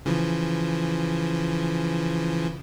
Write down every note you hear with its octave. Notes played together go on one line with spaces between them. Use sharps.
C#3 E3 F3